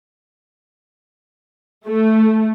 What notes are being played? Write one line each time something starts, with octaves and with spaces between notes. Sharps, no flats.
A3